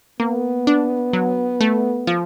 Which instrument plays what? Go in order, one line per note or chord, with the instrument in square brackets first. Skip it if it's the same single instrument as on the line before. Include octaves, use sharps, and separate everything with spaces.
[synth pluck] A#3 [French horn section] B3
[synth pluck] D4
F#3
A3
F3